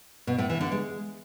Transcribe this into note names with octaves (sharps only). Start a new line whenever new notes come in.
B2
A2
E3
D3
G#3